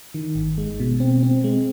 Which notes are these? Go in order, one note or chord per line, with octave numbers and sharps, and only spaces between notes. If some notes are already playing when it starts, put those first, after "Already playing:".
D#3
G#1
G#3
B2
C4
C4
G#3